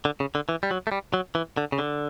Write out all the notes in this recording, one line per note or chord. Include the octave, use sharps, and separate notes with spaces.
D3
C#3
D3
E3
G3
F#3
A3
G3
F#3
E3
D3
C#3
D3